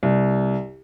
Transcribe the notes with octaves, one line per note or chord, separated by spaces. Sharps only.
C2